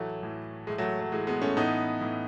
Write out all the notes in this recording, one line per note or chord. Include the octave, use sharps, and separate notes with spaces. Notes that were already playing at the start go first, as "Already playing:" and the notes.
Already playing: A2 E3 F#3 A3
A2 E3
A2 E3 G#3
F#3 A3
F#3
A2 E3 G#3
G#3 B3
A3 C#4
A2 E3 B3 D#4
A2 E3